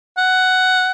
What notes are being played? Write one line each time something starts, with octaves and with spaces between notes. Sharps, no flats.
F#5